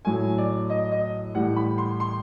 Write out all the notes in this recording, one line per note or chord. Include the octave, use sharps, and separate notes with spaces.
A2 F#3 A3 G#5
D5
D#5
D#5
A2 E3 G3 F#5
B5
C6
C6